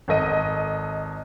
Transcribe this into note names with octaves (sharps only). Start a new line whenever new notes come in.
G#1 A4 D#5 D#7